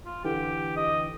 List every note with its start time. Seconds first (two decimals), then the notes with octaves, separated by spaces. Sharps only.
0.05 F4
0.25 D3 E3 G4
0.76 D#5